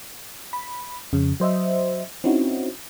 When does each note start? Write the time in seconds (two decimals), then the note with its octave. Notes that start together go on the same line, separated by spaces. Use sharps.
0.53 B5
1.13 F2 C#3
1.40 F#3 C5 D#5 E5
2.24 C4 C#4 D#4 E4 F#4